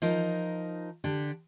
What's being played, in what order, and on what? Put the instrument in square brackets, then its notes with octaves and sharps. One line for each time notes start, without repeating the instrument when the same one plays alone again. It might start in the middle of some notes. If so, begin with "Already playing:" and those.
[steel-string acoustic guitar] F3 D#4 A#4
D3 D4 G4